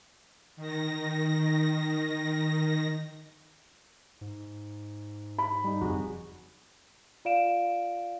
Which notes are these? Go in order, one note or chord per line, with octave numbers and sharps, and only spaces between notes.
D#3 A#6
G#2
B5
G3 D#4
F#1 F2 F#4 G#4
F4 D5 F5 D7 E7